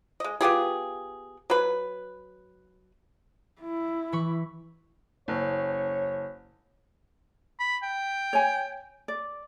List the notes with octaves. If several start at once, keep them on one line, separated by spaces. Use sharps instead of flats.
G#3 D#5
B3 F4 G4 G#4
F#3 B4
E4
E3 B5 C#6
F#1 C#5
B5
G5
C#5 G#5
D5